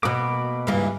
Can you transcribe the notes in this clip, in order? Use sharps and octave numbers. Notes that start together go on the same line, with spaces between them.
B2 A#3 B5 D6
C#2 G2 E3 G3 A#3